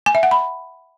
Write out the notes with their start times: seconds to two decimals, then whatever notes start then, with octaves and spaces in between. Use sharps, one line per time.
0.06 G#5
0.15 E5
0.23 F#5
0.31 B5